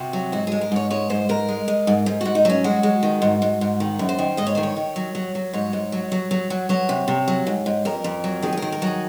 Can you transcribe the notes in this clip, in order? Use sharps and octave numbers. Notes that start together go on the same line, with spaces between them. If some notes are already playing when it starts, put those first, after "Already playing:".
Already playing: C3 F#4
F#3
G#2 F#4
G#3 G#4
A#4
G#2 C#5
G#3 C#5
G#2 C5
G#2 A#4
G#3
G#3
G#2
G#2
G#2 F#4
D#4
F#3 C#4
G#3 F#4
G#3
D#3
G#2
G#2
G#2
D#3
F#2
C5
D#3
G#2 D#5
C#5
D#3 C5
C#5
D#3
F#3
F#3
F#3
G#2 C#5
G#2
F#3
F#3
F#3
F#3
F#3 C#5
C3
C3
F#3
G#2
G#2
F2 A#4
F2
F#3
D#3 G#4
G#4
D#3 A#4
A#4
F#3 G#4